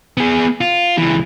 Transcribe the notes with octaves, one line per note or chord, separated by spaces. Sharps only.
B3 G#4
F4
C#2 E3